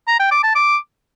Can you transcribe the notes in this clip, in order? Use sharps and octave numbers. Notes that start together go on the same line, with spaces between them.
A#5
G5
D6
A5
D6